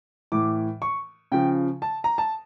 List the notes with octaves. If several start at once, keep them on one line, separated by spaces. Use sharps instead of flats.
A2 E3 D6
C#6
C#3 F3 G5
A5
A#5
A5